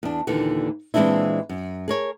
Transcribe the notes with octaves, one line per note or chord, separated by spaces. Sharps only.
E2 D4
D#2 A#2 D3 E3
A#2 E3 G#3 C4 D4 E4
F#2
G#4 A#4 C#5